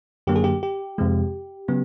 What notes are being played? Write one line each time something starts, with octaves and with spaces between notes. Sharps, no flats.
F#2 D3 F#3 A#3 G4
G#4
G4
G4
F2 C3 F3 G#3
C#3 F#3 B3